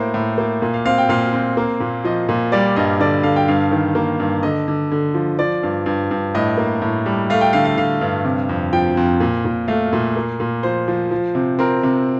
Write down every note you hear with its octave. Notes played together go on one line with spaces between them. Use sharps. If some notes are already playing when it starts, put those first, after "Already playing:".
Already playing: A2 A#3 C5
A2
A#3
A#2
F5
C4 F5
G5
A#2 F5
C4
A#3
A#2
F3 D#5
A#2
G3 D5
G2 D#5
D3 D5
D3 F5
G5
G2 F5
D#3
A#3
G2
D3 D#5
D3
D3
F3
F3 D5
G2
G2
G2
A2 D#5
A#3
A2
G3
A3 F5
G5
D3 F5
F5
D3 F5
G2
C3
F2
F3 G5
F2
A#2
A#2
A3 F5
A#2
A#3
A#2
F3 C5
F3
F3
C3
C4 A#4
C3